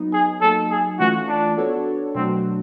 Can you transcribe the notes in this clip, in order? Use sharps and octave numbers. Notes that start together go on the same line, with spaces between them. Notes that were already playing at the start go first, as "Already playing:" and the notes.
Already playing: F#3 B3 D#4
G#4
F#3 A#3 D#4 A4
G#4
E3 A3 C#4 F4 F#4
D4
B3 D4 F#4 A4 C#5
B2 F#3 A3 C4 D4 F#4